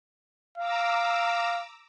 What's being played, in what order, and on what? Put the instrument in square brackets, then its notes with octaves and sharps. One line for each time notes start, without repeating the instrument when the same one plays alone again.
[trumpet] F5 [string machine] A#5 D6 E6